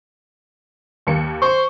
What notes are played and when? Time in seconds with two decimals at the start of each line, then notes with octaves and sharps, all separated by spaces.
1.07 D#2 A#3 C#7
1.42 C5 C#6